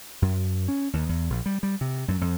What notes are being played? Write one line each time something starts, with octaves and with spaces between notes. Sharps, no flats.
F#2
C#4
D#2
E2
A#1
G3
G3
C3
F#2
F2